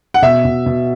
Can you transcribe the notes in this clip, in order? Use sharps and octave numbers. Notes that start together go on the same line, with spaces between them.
F#5
B2 E5
B2
B2